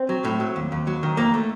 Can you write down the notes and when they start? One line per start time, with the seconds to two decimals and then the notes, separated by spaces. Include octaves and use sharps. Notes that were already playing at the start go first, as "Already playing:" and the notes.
Already playing: C4
0.09 F#3
0.25 A2
0.40 F#3
0.56 D#2
0.72 D#2
0.87 F#3
1.03 D#3
1.17 F2 A#3
1.34 A3